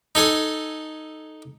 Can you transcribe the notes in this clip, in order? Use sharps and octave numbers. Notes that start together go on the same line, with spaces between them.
D#4 A4 G#5 D#6